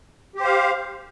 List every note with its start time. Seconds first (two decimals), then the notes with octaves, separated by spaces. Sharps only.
0.36 G4
0.40 C5
0.44 F5